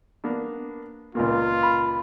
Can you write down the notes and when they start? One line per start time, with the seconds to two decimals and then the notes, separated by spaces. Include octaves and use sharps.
0.24 A#3 B3 D4
1.15 C#2 A#2 A#3 F4
1.63 B5